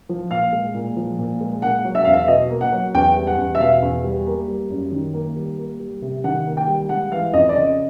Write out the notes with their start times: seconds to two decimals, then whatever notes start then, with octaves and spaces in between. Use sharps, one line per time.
0.09 F3
0.31 A#2 F5
0.53 G#3
0.75 A#2
0.96 F3
1.19 A#2
1.41 G#3
1.62 A#3 F#5
1.85 F#3
1.95 E5
2.04 E2 F5
2.14 E5
2.28 B2 D#5
2.50 A#3
2.61 F#5
2.72 F#3
2.95 E2 G5
3.16 G3
3.27 F#5
3.38 E2
3.55 E5
3.60 B2 F5
3.82 E2
4.04 G3
4.27 A#3
4.48 G3
4.70 F#2
4.92 D#3
5.14 A#3
5.36 G3
5.57 A#3
5.80 G3
6.02 C3
6.24 D#3 F#5
6.46 A#3
6.57 G5
6.67 G3
6.89 G#3 F#5
7.12 E3 F5
7.33 F2 D#5
7.49 D5
7.55 C#3 D#5